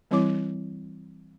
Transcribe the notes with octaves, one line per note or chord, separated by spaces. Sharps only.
E3 G3 C4 E4 C#5 D6